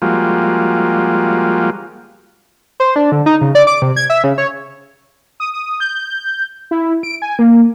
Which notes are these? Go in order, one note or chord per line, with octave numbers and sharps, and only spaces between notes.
F3 G3 G#3 A#3 F4 F#4
C5
D4
D3
D#4
C#3
D5
D6
C3
G#6
E5
C#3
C#5
D#6
D#6
G6
E4
D7
G#5
A#3